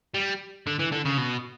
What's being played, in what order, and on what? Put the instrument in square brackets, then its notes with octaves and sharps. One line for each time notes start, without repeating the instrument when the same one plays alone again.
[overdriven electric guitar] G3
D3
E3
D3
C#3
B2